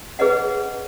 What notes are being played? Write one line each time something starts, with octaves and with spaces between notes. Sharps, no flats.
G#4 B4 C#5 D#5 F#5